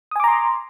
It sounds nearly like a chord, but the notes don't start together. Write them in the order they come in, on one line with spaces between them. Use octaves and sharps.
D#6 G#5 D6 A#5 C6